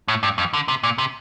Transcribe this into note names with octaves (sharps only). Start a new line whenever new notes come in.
A2
G2
F2
D3
C3
A#2
C3